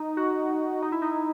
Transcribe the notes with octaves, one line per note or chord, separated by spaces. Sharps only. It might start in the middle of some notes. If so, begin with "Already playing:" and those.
Already playing: D#4
F#4
D#4
E4
D#4
E4